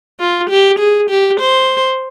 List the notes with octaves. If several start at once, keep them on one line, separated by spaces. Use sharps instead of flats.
F4
G4
G#4
G4
C5